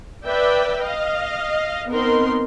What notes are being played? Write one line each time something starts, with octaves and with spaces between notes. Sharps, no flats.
B4 D5 E5 G5
D#5 F5
B3 C4 D#4 A#4 C6